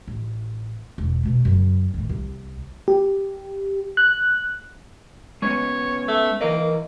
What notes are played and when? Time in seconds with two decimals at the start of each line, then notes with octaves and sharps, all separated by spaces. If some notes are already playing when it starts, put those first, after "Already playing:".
0.08 A1
0.98 E1
1.23 B2 A3
1.45 F#2 C#3
1.94 A2 D#3
2.09 C2
2.88 G4
3.97 F#6
5.42 G#3 B3 C#4 C#5
6.08 A3
6.41 E3 A#3 A#4 D#5